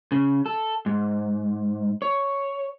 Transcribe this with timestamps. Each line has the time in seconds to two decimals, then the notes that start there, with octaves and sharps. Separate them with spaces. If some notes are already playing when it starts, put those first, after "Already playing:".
0.12 C#3
0.46 A4
0.86 G#2
2.02 C#5